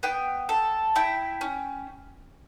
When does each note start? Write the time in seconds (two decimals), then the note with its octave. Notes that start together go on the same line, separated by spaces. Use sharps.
0.03 B3 G5
0.49 A4
0.96 E4 G5
1.41 C#4